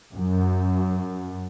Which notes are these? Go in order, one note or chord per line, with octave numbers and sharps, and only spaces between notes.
F#2